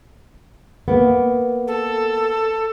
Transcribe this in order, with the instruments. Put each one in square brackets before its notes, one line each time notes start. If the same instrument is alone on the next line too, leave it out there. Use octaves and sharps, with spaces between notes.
[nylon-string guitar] A#3 B3
[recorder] A4